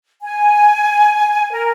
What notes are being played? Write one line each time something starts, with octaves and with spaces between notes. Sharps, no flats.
G#5
A#4